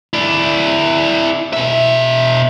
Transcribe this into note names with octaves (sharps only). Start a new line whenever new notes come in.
E4 D5
B2 E5